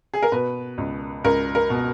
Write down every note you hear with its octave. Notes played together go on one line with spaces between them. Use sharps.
G#4
A#4
B2 B4
C#2
C#2 A#4
A#4
B2